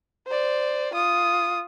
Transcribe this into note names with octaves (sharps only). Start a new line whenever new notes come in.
C5 D5
F4 D#6